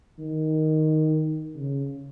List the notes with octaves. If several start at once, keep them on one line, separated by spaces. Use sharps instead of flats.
D#3
C#3